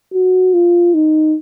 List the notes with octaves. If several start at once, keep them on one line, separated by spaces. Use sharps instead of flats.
F#4
F4
D#4